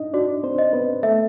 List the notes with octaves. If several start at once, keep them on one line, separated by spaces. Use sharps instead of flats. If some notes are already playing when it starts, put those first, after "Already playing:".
Already playing: D4 D#4 D#5
D4 F#4 D5
C4 C5
D#5
B3 B4
A3 A4 E5